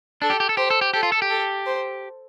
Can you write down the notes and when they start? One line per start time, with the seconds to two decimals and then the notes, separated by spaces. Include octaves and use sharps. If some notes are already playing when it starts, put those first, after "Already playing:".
0.22 D4 A4
0.30 G4
0.40 G4
0.49 A4
0.57 G4 C5
0.70 A4
0.81 G4
0.94 G4 A4
1.03 F4
1.12 A4
1.22 G4
1.30 A4
1.67 C5